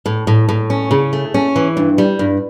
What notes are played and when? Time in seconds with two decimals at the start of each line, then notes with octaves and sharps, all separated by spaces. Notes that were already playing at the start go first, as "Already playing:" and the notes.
0.06 A2
0.27 A2
0.49 A2
0.70 C#4
0.91 C#3
1.13 A3
1.34 C#4
1.56 E3
1.77 G2
1.98 G3
2.19 G2